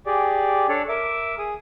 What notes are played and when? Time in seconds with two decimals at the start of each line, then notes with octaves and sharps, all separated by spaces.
0.06 G4 G#4 D5
0.68 D4 A4 C#5 D5
0.89 A#4 E5 D6
1.38 G#4 D#6